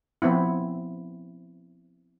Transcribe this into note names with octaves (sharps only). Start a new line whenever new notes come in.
F3 B3 C4 E4